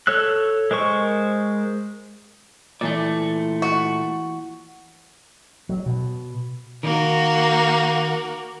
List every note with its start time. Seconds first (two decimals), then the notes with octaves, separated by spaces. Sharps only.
0.07 A4 C#5 E6 F#6
0.71 G#3 A#4 C5 C#6
2.81 A#2 E3 A3 D5
3.62 F#4
5.69 F#3
5.86 B2
6.83 D#3 A#3 F#4